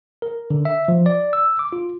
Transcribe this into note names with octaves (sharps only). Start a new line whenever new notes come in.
A#4
D3
E5
F3
D5
E6
D6
F4